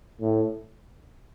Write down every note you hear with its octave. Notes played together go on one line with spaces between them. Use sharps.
A2